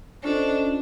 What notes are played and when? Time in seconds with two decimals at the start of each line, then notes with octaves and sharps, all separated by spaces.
0.24 C#4 D4 F4 A4 C5 D#5